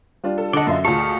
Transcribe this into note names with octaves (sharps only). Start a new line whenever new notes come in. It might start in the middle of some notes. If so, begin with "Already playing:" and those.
G3 D4 F4
A4
D3 D5 D#5 F#5 A5 G7
F#2 F4 E5
D2 A#2 F4 G#4 D#5 F5 A5 C#6